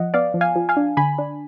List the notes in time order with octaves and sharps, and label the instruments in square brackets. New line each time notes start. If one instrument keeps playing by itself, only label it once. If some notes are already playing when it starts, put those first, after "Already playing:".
Already playing: [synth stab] F3 D#5 F#5
B3 D5 F5
F3
F5 G#5
F3
F5 G#5
D4
D3 G#5 B5
D4